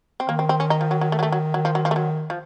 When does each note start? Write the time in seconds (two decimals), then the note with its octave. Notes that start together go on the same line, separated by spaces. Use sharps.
0.20 C4
0.29 D#3 A#3
0.39 C4
0.49 C4
0.60 C#4
0.70 D#4
0.81 F3
0.91 F#3
1.01 F#3
1.12 A3
1.19 F#3
1.23 A3
1.32 F#3
1.54 D#3 F#3
1.65 F3
1.75 F#3
1.85 F3
1.91 A3
1.96 F#3
2.30 F3